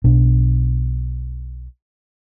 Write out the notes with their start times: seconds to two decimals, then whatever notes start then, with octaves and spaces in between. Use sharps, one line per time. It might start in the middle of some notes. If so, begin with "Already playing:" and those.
0.04 B1 B2 D4